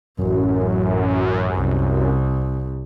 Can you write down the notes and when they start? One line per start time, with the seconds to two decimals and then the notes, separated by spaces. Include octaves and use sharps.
0.19 A1 F#2
1.53 C2